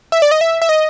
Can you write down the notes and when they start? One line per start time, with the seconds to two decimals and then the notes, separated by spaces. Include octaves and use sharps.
0.12 E5
0.22 D5
0.31 D#5
0.41 E5
0.62 E5
0.69 D#5